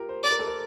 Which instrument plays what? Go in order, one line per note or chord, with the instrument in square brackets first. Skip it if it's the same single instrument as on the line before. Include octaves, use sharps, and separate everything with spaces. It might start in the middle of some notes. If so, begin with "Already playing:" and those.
Already playing: [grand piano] F4 G4 A#4
C5
[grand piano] C5 [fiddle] D5
[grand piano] A#4
A4
A#4